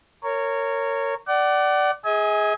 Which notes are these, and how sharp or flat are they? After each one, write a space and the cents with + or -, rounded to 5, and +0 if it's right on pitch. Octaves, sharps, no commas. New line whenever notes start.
A#4 -20 C#5 +0
D5 +0 F#5 +35
G#4 +0 D#5 +45 G#5 +0